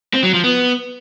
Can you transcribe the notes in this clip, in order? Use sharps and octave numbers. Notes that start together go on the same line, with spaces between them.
C4
F#3
F3
B3